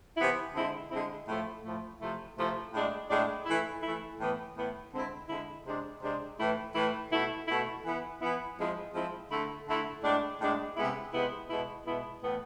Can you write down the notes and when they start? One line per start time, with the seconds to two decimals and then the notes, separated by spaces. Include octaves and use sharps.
0.17 C3 E3 B3 E4
0.55 D3 G#3 C4 E4
0.90 D3 G#3 C4 E4
1.27 A2 F3 A3
1.63 A2 F3 A3
2.00 C3 F3 A3 E4
2.37 C3 F3 A3 E4
2.73 A2 G#3 D4
3.10 A2 G#3 D4
3.46 E3 A3 E4
3.83 E3 A3 E4
4.19 A2 E3 B3
4.56 A2 E3 B3
4.93 D3 G#3 C4 E4
5.29 D3 G#3 C4 E4
5.65 C3 G#3 D4
6.01 C3 G#3 D4
6.39 A2 E3 A3 E4
6.75 A2 E3 A3 E4
7.11 B2 A3 E4
7.47 B2 A3 E4
7.84 E3 B3 E4
8.21 E3 B3 E4
8.58 F3 G#3 C4 E4
8.93 F3 G#3 C4 E4
9.30 D3 A3 E4
9.67 D3 A3 E4
10.03 A2 G#3 D4
10.40 A2 G#3 D4
10.76 C3 G#3 B3 E4
11.13 C3 G#3 B3 E4
11.50 B2 G#3 B3 E4
11.86 B2 G#3 B3 E4
12.23 A2 E3 B3